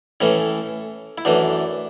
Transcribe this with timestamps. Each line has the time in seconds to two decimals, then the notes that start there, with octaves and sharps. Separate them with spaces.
0.21 A2 E3 A3 C#4
1.18 E4
1.25 F#2 E3 A3 D4